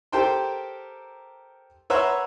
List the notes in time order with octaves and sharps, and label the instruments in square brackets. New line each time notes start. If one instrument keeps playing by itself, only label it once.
[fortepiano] G4 A4 A#4 C5 G5 C6
B4 C#5 E5 F#5 A#5 C6